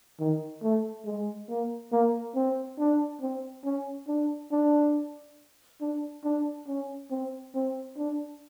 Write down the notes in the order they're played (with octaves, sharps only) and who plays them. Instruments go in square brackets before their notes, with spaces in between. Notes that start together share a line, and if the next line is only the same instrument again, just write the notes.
[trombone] D#3
A3
G#3
A#3
A#3
C4
D4
C4
C#4
D4
D4
D4
D4
C#4
C4
C4
D4